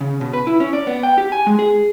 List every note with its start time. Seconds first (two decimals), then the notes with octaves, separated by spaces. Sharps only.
0.01 C#3
0.21 B2
0.33 B4
0.47 E4
0.60 C#4
0.73 D5
0.87 B3
1.03 G5
1.18 G4
1.32 G#5
1.47 G#3
1.59 G#4